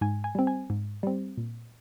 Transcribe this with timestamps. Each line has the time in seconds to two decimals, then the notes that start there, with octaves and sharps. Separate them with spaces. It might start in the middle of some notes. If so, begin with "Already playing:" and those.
0.01 G#2 G#5
0.24 G#5
0.35 G3 C4
0.47 G#5
0.70 G#2
1.03 G3 C4
1.37 A#2